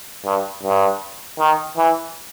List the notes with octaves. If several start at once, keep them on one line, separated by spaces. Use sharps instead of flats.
G2
G2
D#3
E3